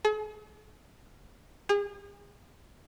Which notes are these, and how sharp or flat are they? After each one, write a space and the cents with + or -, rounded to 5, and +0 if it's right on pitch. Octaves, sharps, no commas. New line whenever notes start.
G#4 +45
G#4 -35